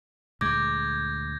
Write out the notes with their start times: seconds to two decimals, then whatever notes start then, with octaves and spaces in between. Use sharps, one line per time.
0.41 D2 A#2 G#3 D6 G6 G#6 A#6